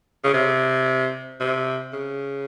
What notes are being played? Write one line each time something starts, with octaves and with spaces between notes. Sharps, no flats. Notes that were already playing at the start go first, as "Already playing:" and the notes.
C#3
C3
C3
C#3